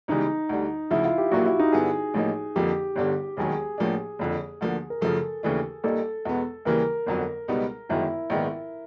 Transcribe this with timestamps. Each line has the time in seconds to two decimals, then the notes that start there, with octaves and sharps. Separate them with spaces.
0.08 C#2 C#3 E3 G3 B3 D#4
0.49 D2 D3 G3
0.91 D2 C#3 F3 E4
1.05 F4
1.18 G4
1.31 A#1 A#2 F#3 A#3 F#4
1.45 E4
1.59 D#4
1.72 G2 D3 G3 B3 E4 G#4
2.14 A1 A2 F3 A#3 D#4
2.56 F2 D3 F3 A#3 G4
2.96 G1 G2 D3 G3
3.37 E1 D#2 D#3 F#3 G#4
3.78 A1 A2 F3 A#3 D4
4.19 F#1 F2 D3 F3
4.61 D2 D3 F3 A#3
4.90 A#4
5.01 F#2 C#3 F3 A3 A4
5.43 D#2 C#3 E3 A3 D4
5.84 A#1 A#2 G3 A#3 D#4 A4
6.25 E2 B2 G#3 B3
6.65 D#2 C#3 E3 G3 A#3 A#4
7.06 G1 F2 D3 F#3
7.48 C#2 B2 G3 B3 D#4
7.89 G1 F#2 D#3 G#3 E4
8.30 A#1 G#2 D#3 G#3 B3